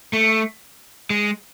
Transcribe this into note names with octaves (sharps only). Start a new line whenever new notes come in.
A3
G#3